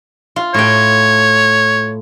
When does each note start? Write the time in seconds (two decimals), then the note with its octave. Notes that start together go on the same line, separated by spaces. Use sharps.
0.36 F4
0.54 A2 C#5 G5